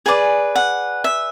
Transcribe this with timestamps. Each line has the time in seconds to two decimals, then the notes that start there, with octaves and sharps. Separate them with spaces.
0.06 G#4 B4 D5 G#5
0.56 F#5
1.04 E5